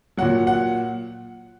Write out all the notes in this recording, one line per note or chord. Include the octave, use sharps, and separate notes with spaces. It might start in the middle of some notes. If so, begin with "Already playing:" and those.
A#2 F#3 F#5
F#5